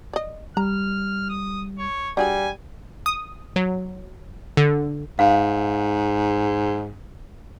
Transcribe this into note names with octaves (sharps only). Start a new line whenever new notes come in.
D5 D#5
G3 A#5 F6
D#6
C#5
G3 D4 F#4 G#4 G#5
D#6
F#3
D3
G#2 F5